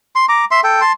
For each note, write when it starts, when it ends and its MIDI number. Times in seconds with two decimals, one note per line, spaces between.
0.15 0.26 84
0.29 0.45 82
0.29 0.45 86
0.51 0.60 76
0.51 0.60 84
0.64 0.81 69
0.64 0.81 79
0.81 0.92 81
0.81 0.92 84